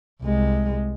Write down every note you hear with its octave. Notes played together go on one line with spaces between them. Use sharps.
C2 G#3